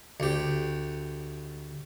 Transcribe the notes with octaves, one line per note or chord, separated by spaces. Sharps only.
D2 G4